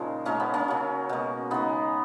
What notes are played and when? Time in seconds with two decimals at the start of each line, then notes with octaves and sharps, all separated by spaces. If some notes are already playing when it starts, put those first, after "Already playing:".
Already playing: A#2 C#3 F3 G#3 A#3 C#4 D#4
0.25 A#2 F3 G#3 A#3 C#4
0.40 B3
0.54 A#3 C#4
0.68 C#3 F#3
1.09 B2 G#3
1.51 C#3 G#3 B3 D#4